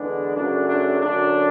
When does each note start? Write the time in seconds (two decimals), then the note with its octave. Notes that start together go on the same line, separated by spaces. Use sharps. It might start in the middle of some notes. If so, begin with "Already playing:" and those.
Already playing: E2 D3 G#3 B3 D4
0.36 F#2 C#3 F#3 A3 D4
0.68 D4
1.01 F#2 D3 F#3 D4